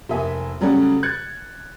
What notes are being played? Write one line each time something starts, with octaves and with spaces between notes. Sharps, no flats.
F1 A#3 E5 G#5
C#3 F#3 G3 A3 C#4
F#6 G#6 A6 C#7